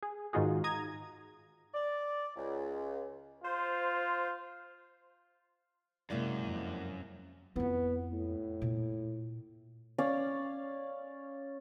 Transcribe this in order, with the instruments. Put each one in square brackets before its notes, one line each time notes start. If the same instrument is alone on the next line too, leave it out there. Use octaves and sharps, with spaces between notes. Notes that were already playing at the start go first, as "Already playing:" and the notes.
[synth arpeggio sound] G#4
G#2 D#3 D#4 F4 F#4 G#4
A#5 D#6 G#6
[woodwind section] D5
C#2
[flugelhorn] F4 [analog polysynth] C5
[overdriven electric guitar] F#2 [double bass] C3 G#3 [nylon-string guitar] A#3 E4 D5
[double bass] F2
[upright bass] F2 E4 [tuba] B3
[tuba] A2
[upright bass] A#2
[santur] C#4 D5 F5